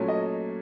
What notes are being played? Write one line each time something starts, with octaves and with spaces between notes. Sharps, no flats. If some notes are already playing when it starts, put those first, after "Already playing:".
Already playing: A#2 F#3 A3 C#4
D#5